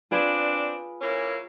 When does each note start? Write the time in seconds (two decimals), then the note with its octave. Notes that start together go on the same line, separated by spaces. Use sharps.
0.11 C4 D4 F4 G#4 B4
1.01 E3 A#3 C#4